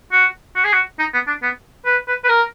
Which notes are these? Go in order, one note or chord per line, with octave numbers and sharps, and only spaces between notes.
F#4
F#4
G#4
F#4
D#4
B3
D4
B3
B4
B4
B4
A#4